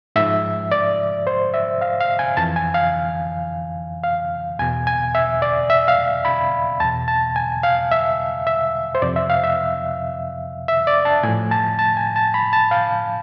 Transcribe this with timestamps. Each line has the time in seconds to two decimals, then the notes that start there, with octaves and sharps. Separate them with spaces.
0.16 G#2 F3 E5
0.72 D5
1.27 C5
1.54 E5
1.81 F5
2.00 F5
2.19 G#5
2.37 F2 E3 A5
2.56 G#5
2.74 F5
4.04 F5
4.59 E2 B2 G#5
4.87 G#5
5.15 E5
5.42 D5
5.70 E5
5.88 F5
6.25 B5
6.80 E2 B2 A5
7.08 A5
7.36 G#5
7.63 F5
7.91 E5
8.47 E5
8.95 C5
9.02 F2 C3 F3 D5
9.16 E5
9.30 F5
9.44 E5
10.68 E5
10.87 D5
11.05 A5
11.23 A2 F3 G#5
11.51 A5
11.79 A5
11.97 G#5
12.16 A5
12.34 B5
12.53 A5
12.71 F5